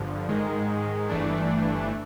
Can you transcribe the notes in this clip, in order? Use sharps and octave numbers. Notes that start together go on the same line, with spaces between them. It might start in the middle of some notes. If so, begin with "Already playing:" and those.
Already playing: G1 G2 D3 F3
G#2 D#3 G#3
G1 G2 E3 A3 D4